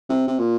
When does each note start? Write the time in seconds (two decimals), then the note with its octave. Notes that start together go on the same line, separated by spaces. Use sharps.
0.10 C3
0.27 C3
0.39 A#2